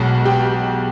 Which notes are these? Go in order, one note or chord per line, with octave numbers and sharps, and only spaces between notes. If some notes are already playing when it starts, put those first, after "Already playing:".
Already playing: B1 B2 G#3
G4